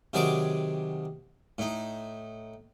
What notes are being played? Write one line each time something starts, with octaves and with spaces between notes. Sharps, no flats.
C3 D#3 F#3 G#4 D5 D6
A2 D#4